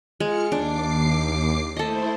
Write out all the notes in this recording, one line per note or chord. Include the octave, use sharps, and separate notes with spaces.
G#3 F4 F6 C#7
D#2 D4 D6 C7
A3 E4 A4 C5 D#5